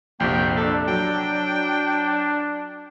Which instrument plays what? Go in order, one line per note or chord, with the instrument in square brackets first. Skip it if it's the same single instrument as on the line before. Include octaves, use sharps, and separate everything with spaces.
[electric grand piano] A#1 F2 C3 [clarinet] A#3 [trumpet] G5
[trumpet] D4 [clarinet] A4
[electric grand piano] F#3 [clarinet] G5